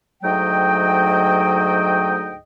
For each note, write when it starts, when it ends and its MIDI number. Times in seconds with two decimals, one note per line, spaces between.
0.23 2.36 38
0.23 2.36 44
0.23 2.36 54
0.23 2.36 57
0.23 2.36 75
0.23 2.36 79